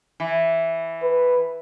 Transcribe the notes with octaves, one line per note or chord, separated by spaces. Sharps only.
E3
B4